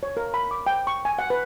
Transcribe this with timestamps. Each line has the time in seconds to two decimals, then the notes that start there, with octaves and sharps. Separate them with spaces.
0.03 C#5
0.17 A#4
0.34 B5
0.51 D6
0.67 G5
0.87 C#6
1.05 G#5
1.19 F#5
1.30 B4